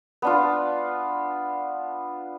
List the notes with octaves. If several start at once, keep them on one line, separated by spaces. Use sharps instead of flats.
B3 D4 F4